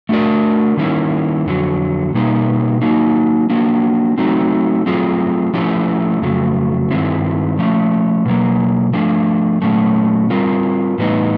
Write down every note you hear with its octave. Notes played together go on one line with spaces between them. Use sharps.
A3 D4 F#4 A#4 D5
D#3 G3 A#3 C#4 E4
F2 D3 F#3
B2 G3 A#3 D#4 G4
F#3 A#3 D#4
F#3 A#3 D4
F#3 A3 C4 D#4
F#3 A3 C4 F4 G#4
F3 A3 C#4 E4 G4
F2 C#3 F#3 A3
G2 D#3 G#3 C4 E4
F3 A3 C#4
B2 F#3 A#3
F3 A3 D4
A#2 F#3 A3 C#4
G3 C4 F4 A#4
A2 E3 G3 B3 D#4